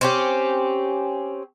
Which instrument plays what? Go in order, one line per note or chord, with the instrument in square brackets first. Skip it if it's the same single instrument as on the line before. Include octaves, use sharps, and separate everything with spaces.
[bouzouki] C4 C#4 G4